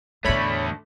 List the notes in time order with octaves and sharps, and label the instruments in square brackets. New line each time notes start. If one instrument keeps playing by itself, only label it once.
[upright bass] E2 A2 [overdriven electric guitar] D3 A3 [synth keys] C#5 B5